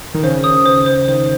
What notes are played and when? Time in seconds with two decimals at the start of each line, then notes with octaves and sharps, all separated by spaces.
0.14 D#3
0.23 C#3 C5
0.44 D#6
0.66 C5
0.86 C5
1.08 D#3 C5